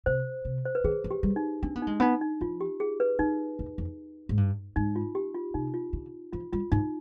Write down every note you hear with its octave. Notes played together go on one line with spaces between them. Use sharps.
C3 C5
C3
C5
B4
D#3 G#4
F3
G4
G3
D#4
C4 D4
B3
G#3 D#4
B3 D#4
D#4
F3 F4
G4
G#4
B4
D#3 D#4
F2
F2
G#2
G2
G#2 D#4
F4
G4
F4
C3 D#4
F4
D3
F3 F4
G3 F4
G#2 D#4